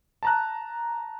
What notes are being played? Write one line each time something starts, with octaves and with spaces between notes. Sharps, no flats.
A5 A#5 F#6